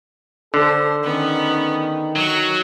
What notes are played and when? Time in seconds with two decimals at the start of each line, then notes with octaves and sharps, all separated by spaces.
0.54 D3 A4 C5
1.03 D#3 B3 C#4
2.16 F#3 C#6 F#6